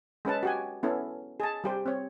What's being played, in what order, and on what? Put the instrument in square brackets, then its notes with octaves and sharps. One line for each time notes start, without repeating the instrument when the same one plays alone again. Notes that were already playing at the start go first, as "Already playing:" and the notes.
[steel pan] G#3 C#4 B4 A5
F#4 G4 G#5
B3 C#4 E4 A4
G#4 A5
G3 G4 C5
C4 C#5